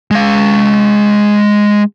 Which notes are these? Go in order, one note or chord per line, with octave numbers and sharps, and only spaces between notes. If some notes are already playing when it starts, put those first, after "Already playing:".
G#3 F5